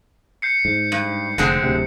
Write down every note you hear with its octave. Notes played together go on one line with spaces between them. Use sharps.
G6 C7 C#7
G#2
G2
F1 D3 G#3 C4
D1 D2 C3